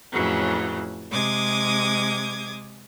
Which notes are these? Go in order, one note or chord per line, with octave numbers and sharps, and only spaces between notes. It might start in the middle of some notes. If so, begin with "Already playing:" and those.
F2 A2 C#3 E3 F#3
C3 G#3 D6 D#6 G#6